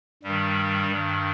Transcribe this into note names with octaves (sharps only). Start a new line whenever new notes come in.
G2 D#3 G3
G2 D#3